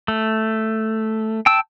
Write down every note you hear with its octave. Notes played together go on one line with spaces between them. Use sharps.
A3
G5 A5 E6